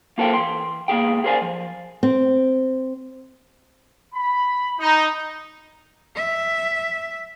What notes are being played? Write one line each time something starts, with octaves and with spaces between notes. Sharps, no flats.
A#3 F4 A4 A#4 C5 G5
E3 G5 C6
C#2 A#3 B3 G#4 G5
G#4 A#4 C5 D5 G#5
F3
C4
B5
D#4
E5